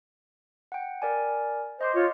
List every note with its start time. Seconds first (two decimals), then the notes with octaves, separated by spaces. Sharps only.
0.72 F#5 G5
1.02 A#4 D5 G#5
1.81 C5 D#5 C6 D6
1.94 F4 C#5